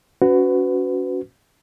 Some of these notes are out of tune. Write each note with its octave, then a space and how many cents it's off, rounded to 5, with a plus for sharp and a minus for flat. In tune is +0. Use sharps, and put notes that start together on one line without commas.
C#4 +25 F#4 +0 B4 +25